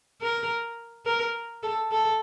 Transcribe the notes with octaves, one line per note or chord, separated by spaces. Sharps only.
A#4
A#4
A4
A4